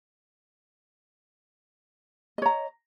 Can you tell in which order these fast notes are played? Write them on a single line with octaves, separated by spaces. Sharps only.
D#5 C#5 A#5